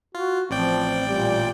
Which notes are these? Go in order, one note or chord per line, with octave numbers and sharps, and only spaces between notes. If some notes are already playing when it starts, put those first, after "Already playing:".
F4 F#4
A1 F3 C4 D5 G5
A#2 G3